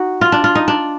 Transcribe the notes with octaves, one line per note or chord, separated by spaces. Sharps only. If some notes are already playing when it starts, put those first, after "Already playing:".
Already playing: D#4 F#4
F4
D4
F4
D#4
D4